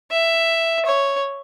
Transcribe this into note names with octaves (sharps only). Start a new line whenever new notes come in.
E5
C#5